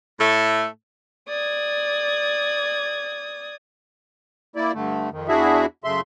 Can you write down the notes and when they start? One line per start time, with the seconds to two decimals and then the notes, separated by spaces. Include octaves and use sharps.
0.19 A2 A3
1.27 D5 D#6 G#6
4.56 A#3 E4 D5
4.74 G2 D3 A3
5.12 F2 D#3
5.28 E2 D4 E4 F#4 G#4 E5
5.84 F#2 C#3 A3 E5 C6